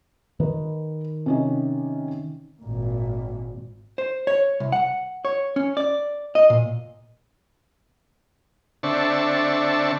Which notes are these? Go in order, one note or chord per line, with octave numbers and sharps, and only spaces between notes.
D#3 B4
C3 C#4 D#4
G#1 A#2
C5
C#5
C2
F#5
C#5
C#4
D5
D#5
A#2
D3 C4 D4 E5 A5 C#6